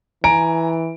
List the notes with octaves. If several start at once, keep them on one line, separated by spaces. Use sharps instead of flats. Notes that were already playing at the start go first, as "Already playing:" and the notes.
E3 G#5 A#5 D7